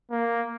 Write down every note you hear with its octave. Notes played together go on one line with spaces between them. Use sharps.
A#3